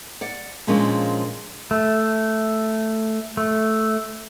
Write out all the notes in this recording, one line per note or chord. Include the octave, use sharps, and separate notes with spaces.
D5 F#5
A#2 F3 G#3 A#3 C#4 D4
A3
A3